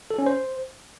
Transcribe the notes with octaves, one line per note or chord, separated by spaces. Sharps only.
A4
C#4
C5